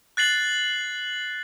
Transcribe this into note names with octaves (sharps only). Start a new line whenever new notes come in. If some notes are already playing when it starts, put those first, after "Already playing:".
F#6 A6 C7 F#7